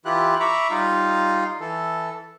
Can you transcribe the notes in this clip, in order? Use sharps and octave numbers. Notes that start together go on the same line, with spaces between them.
E3 E4 F4 G4 F#6
E5 A#5 B5 C#6 D6
G3 D#4 F4 F5
E3 A4